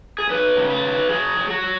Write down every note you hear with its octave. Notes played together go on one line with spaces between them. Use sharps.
G#4
F#3 B4
C#3
B4
F#3
F#3 G#4
F#3
F#4
F#3